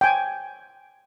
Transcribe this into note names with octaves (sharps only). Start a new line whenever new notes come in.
G5 G#5